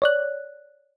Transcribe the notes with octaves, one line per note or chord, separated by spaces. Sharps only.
C#5 D5 F#6